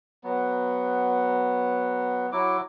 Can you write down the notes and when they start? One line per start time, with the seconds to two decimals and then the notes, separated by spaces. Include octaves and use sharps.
0.24 F#3 B3
2.32 F#3 E4 D6